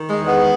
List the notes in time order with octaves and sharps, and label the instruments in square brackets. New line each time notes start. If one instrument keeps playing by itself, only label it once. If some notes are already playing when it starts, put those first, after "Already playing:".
Already playing: [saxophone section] D#3
G#3
E2
G#3 B3